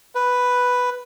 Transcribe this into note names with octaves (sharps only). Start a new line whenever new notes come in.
B4